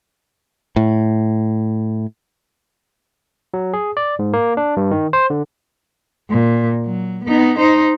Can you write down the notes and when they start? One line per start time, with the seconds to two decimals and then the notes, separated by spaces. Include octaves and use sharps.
0.76 A2
3.54 F#3
3.74 G#4
3.97 D5
4.19 G#2
4.33 A#3
4.57 D4
4.77 G2
4.91 D#3
5.13 C5
5.30 D3
6.30 A#2
6.85 F#3
7.25 B3 D#4
7.59 D#4 C5